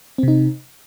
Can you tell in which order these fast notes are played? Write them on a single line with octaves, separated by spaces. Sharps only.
C4 C3 D#4